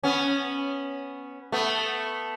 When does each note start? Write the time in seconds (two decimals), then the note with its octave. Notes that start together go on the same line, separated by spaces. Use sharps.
0.03 B3 C#4
1.52 A3 B3